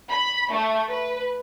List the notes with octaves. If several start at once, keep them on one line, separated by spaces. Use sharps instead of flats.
B5
A3
B4